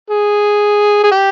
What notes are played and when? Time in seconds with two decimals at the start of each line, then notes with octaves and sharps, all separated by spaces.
0.10 G#4
1.03 G#4
1.12 G4